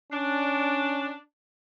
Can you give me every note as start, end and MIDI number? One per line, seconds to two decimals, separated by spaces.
0.12 1.14 61
0.12 1.20 62